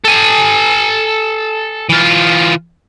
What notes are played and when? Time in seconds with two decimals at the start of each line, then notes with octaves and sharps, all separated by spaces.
0.04 A4 G#5
1.89 E3 F4